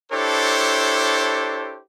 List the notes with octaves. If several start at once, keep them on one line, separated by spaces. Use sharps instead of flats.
D4 E4 G4 A4 C5 C#5